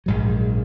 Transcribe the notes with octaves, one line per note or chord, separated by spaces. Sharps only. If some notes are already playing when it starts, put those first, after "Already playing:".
A#1 G#2 F#3